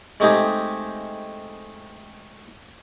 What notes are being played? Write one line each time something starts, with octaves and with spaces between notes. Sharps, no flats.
G#3 A3 C4 D#4 G4 G#4